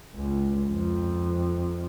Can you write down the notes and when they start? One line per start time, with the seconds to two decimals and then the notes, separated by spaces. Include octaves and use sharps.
0.15 C#2
0.70 F2